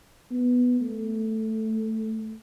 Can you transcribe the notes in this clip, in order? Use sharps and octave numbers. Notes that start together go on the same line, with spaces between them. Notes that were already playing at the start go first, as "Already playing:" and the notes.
B3
A3